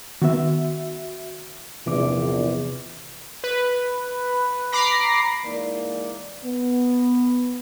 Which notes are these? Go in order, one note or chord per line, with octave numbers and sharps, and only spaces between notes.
D#3 B3 F#4 E5
A#1 E2 C3 E3 D6
B4
A#5 B5 D6 A#6 C7
E3 G#3 A#3 D#4 D5
B3